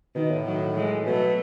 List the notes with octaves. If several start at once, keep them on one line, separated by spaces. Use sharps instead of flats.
B2 D#3
A2
D#3 F#3
E3 G#3
B2 F#3 A3